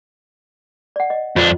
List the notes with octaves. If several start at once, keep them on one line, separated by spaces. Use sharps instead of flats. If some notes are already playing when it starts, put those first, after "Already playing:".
D5 F#5
D#5
F2 D4 F4